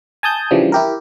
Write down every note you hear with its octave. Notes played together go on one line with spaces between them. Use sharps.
G#5 A5 D#6 G6
C#3 E3 F3 G3 D4
E4 G4 A#4